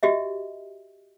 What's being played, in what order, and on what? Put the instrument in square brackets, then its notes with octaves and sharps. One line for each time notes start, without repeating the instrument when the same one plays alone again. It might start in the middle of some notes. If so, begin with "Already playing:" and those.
[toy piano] F#4 G4 D#5 E5